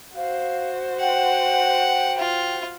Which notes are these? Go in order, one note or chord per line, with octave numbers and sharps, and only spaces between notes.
F#4 C5 F5
F#5 G5
F4